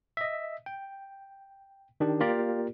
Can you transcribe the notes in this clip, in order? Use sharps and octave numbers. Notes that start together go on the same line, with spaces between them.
D#5 E5
G5
D#3 D4 G4
A#3 F4 G4 A#4 D5